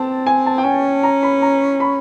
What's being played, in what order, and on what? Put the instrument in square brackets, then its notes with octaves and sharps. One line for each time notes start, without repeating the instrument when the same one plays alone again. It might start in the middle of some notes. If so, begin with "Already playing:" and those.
Already playing: [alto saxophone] C4 [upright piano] A5
[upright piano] G#5
A5
G5
[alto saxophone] C#4 [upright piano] G#5
[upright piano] A#5
B5
A#5
B5